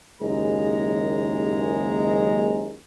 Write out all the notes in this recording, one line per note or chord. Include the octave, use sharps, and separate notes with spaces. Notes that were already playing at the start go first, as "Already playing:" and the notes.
F#1 D#2 G#3 A#5